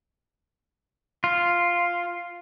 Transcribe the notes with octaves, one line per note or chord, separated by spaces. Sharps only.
F4